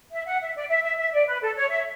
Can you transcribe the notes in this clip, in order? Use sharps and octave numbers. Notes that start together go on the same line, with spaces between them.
E5
F#5
E5
D5
E5
E5
E5
D5
B4
A4
C#5
E5